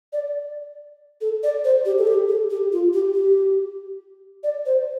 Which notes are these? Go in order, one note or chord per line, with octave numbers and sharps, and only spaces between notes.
D5
A4
D5
C5
G4
A4
G4
A4
G4
F4
G4
G4
D5
C5